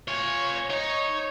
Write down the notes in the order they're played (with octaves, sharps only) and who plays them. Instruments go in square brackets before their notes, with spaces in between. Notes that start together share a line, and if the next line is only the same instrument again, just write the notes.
[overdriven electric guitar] F4 G#5 [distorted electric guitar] C#5
[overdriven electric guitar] D#4 [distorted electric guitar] C#5